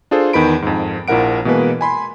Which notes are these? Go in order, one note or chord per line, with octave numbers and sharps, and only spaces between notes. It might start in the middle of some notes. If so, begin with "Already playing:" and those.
D4 F4 G#4 A4 C5
E2 D#3 B4 B5 D7
F2 G#2
A#1 F3 E4 A#4 F#5 D7
B2 E3 G#3 A#3 B4
G#5 B5 C6